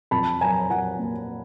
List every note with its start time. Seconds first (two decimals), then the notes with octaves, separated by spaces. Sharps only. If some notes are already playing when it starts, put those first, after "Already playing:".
0.11 F2 A5 B5
0.41 F#3 G#5 A#5
0.70 F#3 F#5 G#5
0.99 A#3